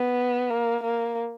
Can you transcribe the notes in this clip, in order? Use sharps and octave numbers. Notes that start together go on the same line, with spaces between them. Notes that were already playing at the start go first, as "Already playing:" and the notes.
Already playing: B3
A#3
A#3